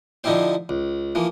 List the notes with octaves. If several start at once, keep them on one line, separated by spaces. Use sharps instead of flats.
D3 F3 D#4 E4 G4 C5
C#2
E3 F3 A#3